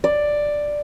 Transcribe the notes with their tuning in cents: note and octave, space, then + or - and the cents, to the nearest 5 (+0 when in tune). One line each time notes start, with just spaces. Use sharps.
D5 +5